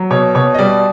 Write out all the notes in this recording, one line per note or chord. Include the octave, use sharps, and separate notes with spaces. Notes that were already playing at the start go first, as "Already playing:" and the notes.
Already playing: F#3
B2 C#5
B2 C#5
D#5
G3 D5